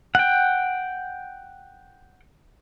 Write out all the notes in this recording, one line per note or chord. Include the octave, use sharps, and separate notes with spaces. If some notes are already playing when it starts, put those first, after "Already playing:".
F#5 G5